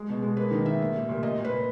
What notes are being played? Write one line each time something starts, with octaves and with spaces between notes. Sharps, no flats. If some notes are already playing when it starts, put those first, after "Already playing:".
Already playing: G#3
B2
G#3
A#3 B4
D#3
A#3 E5
A#2
G3
A#2
A#2 D#5
A#2
B4
A#2